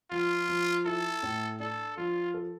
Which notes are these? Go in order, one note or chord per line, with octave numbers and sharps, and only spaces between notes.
F3 F4
F3
E4 A4
A2
D4 A4
F3 F4
A4